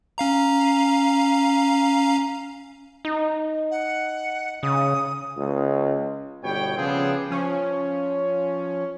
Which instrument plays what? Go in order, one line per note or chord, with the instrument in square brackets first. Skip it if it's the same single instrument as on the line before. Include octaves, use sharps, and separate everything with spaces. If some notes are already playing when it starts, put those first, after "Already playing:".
[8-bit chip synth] C#4 F5 A#5
[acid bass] D#4
[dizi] F#5
[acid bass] C#3 [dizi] D#6
[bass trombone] C#2
[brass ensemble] G1 B2 G4 C#5 G5
C#3 F3 B3 C4 D4 G#4
[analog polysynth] F3 C#4